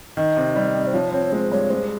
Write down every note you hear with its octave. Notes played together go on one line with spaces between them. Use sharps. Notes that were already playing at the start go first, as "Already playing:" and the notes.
D#3 D#5
C3
G3
C3
C5
F3 C#5
C4 C#5
G#3 C5
G2 C#5
G#3 C5